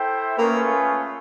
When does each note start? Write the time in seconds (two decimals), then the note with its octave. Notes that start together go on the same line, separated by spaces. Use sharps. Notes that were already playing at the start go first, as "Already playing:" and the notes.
Already playing: E4 A4 C5 E5 G5
0.37 A3 A#3 C#4 F4 G#4 B4